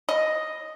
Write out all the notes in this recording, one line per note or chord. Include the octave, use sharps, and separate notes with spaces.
D#5